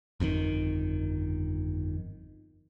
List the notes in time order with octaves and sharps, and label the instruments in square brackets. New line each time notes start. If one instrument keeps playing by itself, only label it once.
[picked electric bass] G1 F2 A#2 D#3